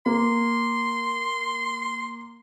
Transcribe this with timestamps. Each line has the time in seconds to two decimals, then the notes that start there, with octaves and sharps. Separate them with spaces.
0.06 A#3 C6